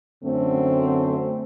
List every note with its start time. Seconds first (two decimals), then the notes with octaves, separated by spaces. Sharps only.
0.24 F#2 D3 A3 C4